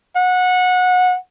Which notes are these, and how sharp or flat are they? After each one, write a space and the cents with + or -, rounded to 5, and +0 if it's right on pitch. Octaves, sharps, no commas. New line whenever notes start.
F#5 -20